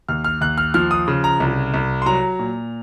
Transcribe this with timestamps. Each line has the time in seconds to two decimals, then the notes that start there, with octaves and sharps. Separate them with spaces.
0.09 D#2 F6
0.24 F6
0.41 D#2 F#6
0.58 F6
0.74 F3 F6
0.91 D#6
1.08 C#3
1.24 A#5
1.40 C2
1.74 C2
2.02 C6
2.06 F#3 A#5
2.39 A#2